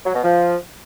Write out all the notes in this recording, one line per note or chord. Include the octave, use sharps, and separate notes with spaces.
F#3
B2
F3